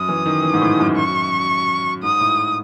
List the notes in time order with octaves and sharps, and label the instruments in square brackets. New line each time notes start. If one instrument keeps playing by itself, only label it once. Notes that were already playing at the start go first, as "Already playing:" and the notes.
Already playing: [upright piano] F#2 [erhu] D#6
[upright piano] E3
D#3
E3
G#2
A2
F#2
[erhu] C#6
[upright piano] G#2 [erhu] D#6
[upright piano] A2